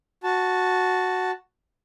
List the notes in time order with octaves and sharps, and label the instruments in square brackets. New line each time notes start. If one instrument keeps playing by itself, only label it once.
[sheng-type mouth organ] F#4 A5